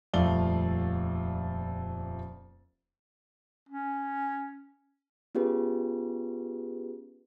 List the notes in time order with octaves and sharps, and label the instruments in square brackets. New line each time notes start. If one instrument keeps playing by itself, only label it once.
[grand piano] D#1 F2 A3 D5 F5 G7
[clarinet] C#4
[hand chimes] B3 C#4 F4 G4 G#4 B4